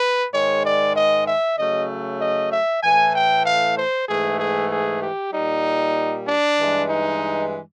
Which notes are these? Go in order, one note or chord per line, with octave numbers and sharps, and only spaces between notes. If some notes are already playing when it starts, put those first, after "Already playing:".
Already playing: B4
G#2 D#3 G#3 C#5
D5
D#5
E5
C#3 F#3 A3 D#5
D#5
E5
A2 E3 A3 G#5
G5
F5
C5
G#2 E3 A3 G#4
G#4
G#4
G4
A#2 G3 D#4
D4
G2 E3 G#3
D#4